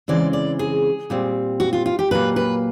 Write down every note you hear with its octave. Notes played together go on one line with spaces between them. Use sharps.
C#3 E3 G#3 C4 D5
D5
G#4
A#2 G3 C4
F#4
F4
F4
G4
A#2 F#3 A#3 B4
B4